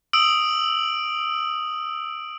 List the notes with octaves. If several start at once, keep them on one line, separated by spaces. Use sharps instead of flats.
D#6 E6 D7 F#7